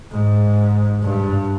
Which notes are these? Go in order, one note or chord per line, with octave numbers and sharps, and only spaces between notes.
G#2
G2